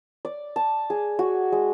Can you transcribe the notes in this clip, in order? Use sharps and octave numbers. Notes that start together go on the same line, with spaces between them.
D5
A5
G#4
F#4
G#3